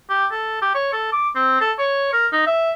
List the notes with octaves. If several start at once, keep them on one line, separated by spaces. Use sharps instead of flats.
G4
A4
G4
C#5
A4
D6
C4
A4
C#5
A#4
D#4
E5